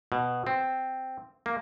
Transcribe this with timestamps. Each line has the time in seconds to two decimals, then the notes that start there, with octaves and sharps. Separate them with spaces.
0.12 B2
0.47 C4
1.46 A#3